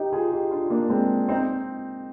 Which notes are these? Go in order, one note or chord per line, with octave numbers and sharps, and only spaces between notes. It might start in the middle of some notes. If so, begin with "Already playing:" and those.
Already playing: D#4 G4
F4 G#4
D#4 G4
D4 F4
A#3 D4
G#3 C4
C4 D#4